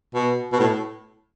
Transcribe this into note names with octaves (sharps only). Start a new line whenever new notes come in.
B2
B2
A2